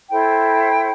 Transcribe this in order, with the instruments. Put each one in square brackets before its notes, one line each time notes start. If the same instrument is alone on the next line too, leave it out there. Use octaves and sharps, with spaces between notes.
[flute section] E4 A4 C5 G5